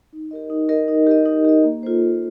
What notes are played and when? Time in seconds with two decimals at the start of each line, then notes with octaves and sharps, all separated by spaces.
0.13 D#4
0.31 G4 A#4 D#5
0.50 D#4
0.68 G4 A#4 D#5
0.88 D#4
1.07 G4 A#4 D#5
1.26 D#4
1.45 G4 A#4 D#5
1.64 A#3
1.83 F4 A4 C5
2.01 A#3